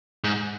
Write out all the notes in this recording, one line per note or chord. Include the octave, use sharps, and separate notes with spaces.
G#2